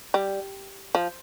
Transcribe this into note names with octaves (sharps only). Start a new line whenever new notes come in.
G3
F3